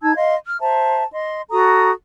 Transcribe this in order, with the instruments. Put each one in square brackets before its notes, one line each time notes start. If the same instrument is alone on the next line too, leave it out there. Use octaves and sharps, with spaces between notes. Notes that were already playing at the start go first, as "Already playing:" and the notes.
[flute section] D#4 A5 E6 G#6
D#5 F5 C6
F6
C5 E5 A5 A#5
D#5 C6
F#4 A4 A#5 D#6